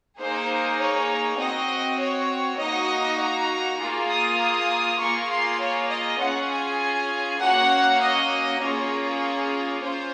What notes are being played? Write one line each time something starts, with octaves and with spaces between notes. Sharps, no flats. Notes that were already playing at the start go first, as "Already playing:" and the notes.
A#3 D#4 G#4 C5
C#5
C4 F#4 D#5
C#5
A#3 D#4 F#4 D#5
A#5
A#3 F4 G#4
D#6
D#6
A#3 F4 G#4 C#6
C6
C#5
D#5
C#4 F4 G#4 F#5
G#5
A#3 C#4 F#4 F#5
D#5
A#3 C#4 F4 G#4 C#5
C#4 F4 C5